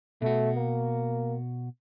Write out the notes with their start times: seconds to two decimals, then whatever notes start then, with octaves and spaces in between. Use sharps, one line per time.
0.22 B2 A3 F#4
0.56 A#3